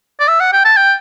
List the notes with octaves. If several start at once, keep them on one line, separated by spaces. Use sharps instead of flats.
D5
E5
F#5
G5
A5
G5